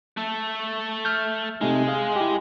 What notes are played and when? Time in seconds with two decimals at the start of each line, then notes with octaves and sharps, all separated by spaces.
0.17 A3 A4
1.05 F6 G6
1.61 C3 G#3 A3 D#4
1.88 G#4 F5
2.16 E4 G4